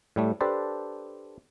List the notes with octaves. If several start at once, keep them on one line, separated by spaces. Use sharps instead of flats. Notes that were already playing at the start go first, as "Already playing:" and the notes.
A2 G3 A3
D4 G4 A4 B4 C5 D5